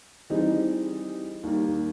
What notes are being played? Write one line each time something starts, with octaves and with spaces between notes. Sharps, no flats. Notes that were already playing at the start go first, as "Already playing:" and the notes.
E3 G3 C4 D#4 G#4
D#2 D#3 G3 A#3